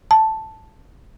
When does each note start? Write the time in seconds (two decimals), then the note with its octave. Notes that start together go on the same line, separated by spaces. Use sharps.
0.11 A5